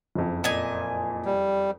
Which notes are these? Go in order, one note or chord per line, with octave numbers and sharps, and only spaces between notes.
F#1 F2
A#2 D#5 G#5
G3